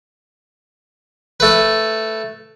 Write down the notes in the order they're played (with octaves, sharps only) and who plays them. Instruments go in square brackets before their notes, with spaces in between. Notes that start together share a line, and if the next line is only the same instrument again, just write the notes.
[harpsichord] A3 B4